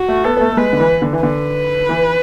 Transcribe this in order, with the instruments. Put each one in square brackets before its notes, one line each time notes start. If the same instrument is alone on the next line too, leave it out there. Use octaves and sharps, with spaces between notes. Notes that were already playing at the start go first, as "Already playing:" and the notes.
Already playing: [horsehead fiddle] F#4
[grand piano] A3
[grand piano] B3 [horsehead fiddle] A4
[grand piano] B3
A3
A3
[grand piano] G#3 [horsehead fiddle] B4
[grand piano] D3
E3
D3
E3
[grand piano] D3 [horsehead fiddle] B4
[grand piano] E3